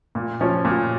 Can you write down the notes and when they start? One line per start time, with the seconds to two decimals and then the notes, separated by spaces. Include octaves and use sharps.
0.15 A#2
0.41 F3 C#4
0.65 A#2